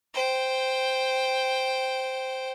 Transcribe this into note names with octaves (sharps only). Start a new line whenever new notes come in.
C5 G5